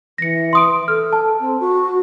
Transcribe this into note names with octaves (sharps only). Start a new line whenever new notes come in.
E3 A#6 C#7
C6 D#6 D7
A4 F6
A5
C4
F#4